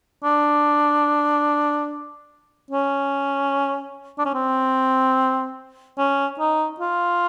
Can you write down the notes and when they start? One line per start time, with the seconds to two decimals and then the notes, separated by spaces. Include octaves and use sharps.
0.24 D4
2.71 C#4
4.18 D4
4.26 C#4
4.34 C4
5.98 C#4
6.39 D#4
6.80 F4